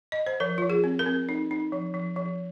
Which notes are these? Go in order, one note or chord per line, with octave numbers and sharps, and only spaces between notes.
D#5
C5
F3 A#4
F3 F4
G#4
C4
A#4
C4
D#4
D#4
F3
F3
F3